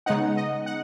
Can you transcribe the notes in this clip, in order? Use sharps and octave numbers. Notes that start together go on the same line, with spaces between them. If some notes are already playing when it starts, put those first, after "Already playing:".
C#3 G#3 B3 D#4 F#5
D#5
F#5